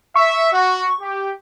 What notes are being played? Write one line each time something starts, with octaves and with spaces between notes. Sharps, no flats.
E5 C#6
F#4
G4